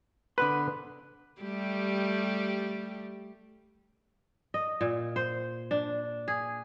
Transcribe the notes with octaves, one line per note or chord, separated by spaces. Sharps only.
D3 B3 B4 C6
G3 A3 G4
D#5
A#2
C5
D4
G#4